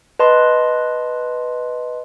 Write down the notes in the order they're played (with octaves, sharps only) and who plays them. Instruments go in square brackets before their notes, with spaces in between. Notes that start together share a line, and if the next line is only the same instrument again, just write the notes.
[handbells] B4 D#5 A5 C6